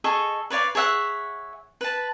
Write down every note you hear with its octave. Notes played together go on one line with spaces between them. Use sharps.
G#4 A4 D#5 C#6
B4 C#5 D5 F5
G#4 C#5 E5 F#5
B4 A5